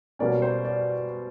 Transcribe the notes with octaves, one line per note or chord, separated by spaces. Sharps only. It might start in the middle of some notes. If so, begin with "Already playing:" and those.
B2 G3 A#3 C#4 D5
C5
D5